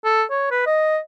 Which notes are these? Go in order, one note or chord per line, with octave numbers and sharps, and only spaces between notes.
A4
C#5
B4
D#5